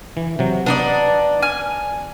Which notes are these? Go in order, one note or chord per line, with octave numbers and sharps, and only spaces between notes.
E3
C3 F#3
B3 D4 D#4 D5
G#5 F6